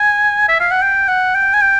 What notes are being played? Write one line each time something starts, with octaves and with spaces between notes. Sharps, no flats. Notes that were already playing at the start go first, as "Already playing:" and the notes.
Already playing: G#5
E5
F5
F#5
G5
F#5
G5
G#5
G5